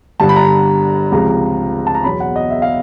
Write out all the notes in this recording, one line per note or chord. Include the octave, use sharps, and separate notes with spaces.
G1 G2 D3 A5
B5
A#5
C#2 C3 F3 G#3 A#5
A5
A#5
E2 B2 F#3 B5
F#5
D#5
E5
F5